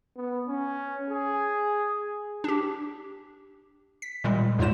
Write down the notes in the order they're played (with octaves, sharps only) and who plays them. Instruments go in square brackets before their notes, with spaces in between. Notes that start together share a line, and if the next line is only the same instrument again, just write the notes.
[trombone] B3
C#4
G#4
[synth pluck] D4 G4
B6
A#2 D#3 G3 G#3
E2 G#2 G#3 F4 C5 E7